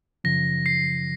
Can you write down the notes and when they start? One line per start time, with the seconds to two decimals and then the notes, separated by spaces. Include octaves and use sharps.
0.24 F#2 C#3 F3 A#6
0.66 C7